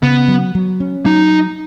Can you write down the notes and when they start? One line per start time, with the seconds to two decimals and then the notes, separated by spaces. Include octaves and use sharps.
0.03 C#3 B3
0.28 F#3
0.55 F#3
0.80 C#4
1.06 F#3 D#4